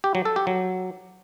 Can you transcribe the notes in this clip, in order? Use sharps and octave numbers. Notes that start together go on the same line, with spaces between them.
G4
F#3
A4
G4
F#3